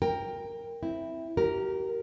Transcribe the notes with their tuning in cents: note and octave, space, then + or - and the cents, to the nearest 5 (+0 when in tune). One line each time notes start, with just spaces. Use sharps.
A#4 +0 G5 +15
C4 +0 E4 +0
G4 -35 A#4 +0